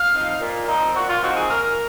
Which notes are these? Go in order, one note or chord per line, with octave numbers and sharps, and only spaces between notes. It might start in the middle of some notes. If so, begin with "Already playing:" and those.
Already playing: F5
F3 C4 D#4
A#2
F3 C4 D#4
A#2 F#4
F4
F3 C4 D#4 F#4
G#4
A#2 A#4